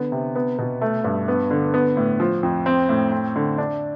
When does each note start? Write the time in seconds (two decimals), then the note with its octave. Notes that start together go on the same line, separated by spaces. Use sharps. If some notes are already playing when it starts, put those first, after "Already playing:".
Already playing: D3 B3
0.12 C3
0.36 B3
0.58 B2
0.81 A3
1.04 G2
1.28 B3
1.51 D3
1.74 B3
1.97 A2
2.20 F3
2.43 F2
2.66 C4
2.89 A2
3.12 C4
3.36 D3
3.58 D4